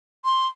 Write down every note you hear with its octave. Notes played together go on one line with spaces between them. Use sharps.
C6